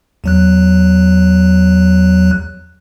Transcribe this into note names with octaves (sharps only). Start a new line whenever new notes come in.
E2 F#3 F#6